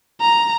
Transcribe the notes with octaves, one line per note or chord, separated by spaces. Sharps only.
A#5